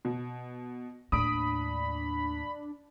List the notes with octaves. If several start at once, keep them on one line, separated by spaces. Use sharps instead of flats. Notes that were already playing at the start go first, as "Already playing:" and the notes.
B2
D#2 A2 D4 B5 D#6 D7